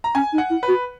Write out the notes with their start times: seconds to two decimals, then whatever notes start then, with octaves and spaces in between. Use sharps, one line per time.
0.04 A#5
0.15 C#4 G#5
0.33 D#4
0.38 F#5
0.50 E4
0.63 B4
0.68 F#4